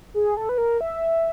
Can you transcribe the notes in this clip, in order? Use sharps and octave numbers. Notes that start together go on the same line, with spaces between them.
G#4
A4
B4
A#4
E5